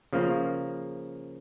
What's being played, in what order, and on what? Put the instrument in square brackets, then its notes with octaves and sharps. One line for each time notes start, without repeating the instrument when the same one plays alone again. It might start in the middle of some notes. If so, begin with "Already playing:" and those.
[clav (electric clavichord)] C#3 F3 A#3